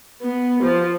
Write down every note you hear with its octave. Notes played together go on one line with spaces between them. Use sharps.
B3
F3